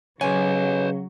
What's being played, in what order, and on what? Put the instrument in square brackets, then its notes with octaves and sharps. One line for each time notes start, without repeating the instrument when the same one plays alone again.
[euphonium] C#3 [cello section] F#3 [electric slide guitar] B4 C#5 [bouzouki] G#5